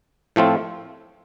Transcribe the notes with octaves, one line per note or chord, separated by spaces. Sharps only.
A2 F3 A3 C4 F4